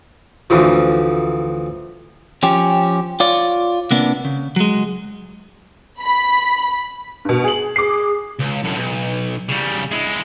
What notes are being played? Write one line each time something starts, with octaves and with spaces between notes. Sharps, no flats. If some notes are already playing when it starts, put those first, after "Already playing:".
D2 E3 F3
F3 C#4 G4
F4 C#5 D5
C3 A#3 B3 D4
C#3
F#3 G#3
B5
G2 B2
G#4 F#7
G#4 D6 C7
C#2
F#2 A2
B1
C#3 G3
G#3 E4